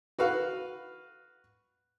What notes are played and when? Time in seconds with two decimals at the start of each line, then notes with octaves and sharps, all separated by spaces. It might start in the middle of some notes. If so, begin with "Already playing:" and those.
0.19 F#4 B4 F5